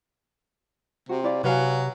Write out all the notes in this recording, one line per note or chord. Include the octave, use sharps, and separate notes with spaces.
C3 F#4
E4 D5 F5
C3 F#3 B4 F5 G#5